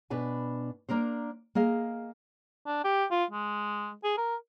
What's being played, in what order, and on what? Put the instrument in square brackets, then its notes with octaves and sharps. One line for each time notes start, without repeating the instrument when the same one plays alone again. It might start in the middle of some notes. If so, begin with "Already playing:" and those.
[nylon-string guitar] B2 D4 B4 G#5
A#3 D4 A#4 C5
A#3 G#4 D#5 F5
[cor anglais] D4
G4
F4
G#3
G#4
A#4